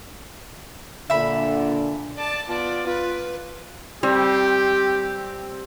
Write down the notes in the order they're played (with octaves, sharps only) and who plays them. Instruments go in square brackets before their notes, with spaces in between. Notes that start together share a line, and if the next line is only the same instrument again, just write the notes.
[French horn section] A#2 D3 [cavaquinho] E5 B5
[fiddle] D5 A5
[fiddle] B3 D5 [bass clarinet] F4
[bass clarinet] F4 [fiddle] B4
[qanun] G3 [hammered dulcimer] C4 [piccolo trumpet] G4